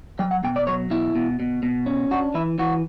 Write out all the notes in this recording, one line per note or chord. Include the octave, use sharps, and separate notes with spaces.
F#3 G5
F#5
B2 G5
D5
F#3 C#5
B2 E4
B2
B2
B2
C#4
D4 F#4
E3 E4
E3 F#4